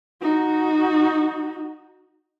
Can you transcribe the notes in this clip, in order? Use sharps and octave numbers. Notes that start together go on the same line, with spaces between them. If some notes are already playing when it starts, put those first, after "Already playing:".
D#4 F#4